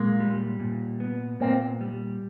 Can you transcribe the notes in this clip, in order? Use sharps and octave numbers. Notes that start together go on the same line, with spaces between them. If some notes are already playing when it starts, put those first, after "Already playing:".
Already playing: A#2 G#3 A#3
G3
A#2
B3
A#2 A#3 C4
G3